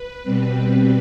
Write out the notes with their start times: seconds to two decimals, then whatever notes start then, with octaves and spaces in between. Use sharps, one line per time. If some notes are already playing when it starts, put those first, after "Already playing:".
Already playing: B4
0.23 B2 G3 C4